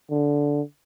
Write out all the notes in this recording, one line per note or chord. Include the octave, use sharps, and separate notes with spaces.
D3